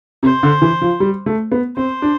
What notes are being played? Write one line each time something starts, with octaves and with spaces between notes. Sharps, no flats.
C3 C5
D3
E3
F3
G3
A3
B3
C4 C5
D4